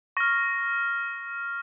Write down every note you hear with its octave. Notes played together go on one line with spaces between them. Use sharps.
C#6 F6 A#6